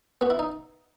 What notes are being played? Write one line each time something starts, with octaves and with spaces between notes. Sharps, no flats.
B3 F#4
E4
D#4